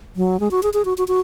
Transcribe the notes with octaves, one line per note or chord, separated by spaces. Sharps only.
F#3
G#3
F#4
G#4
G#4
F#4
F#4
F#4